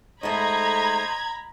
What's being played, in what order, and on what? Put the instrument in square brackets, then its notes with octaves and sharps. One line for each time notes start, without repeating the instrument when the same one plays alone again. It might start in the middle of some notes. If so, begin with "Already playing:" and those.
[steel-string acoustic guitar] G#2 A3 [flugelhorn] C5 [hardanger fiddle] D#5 [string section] A#5 B5 G#6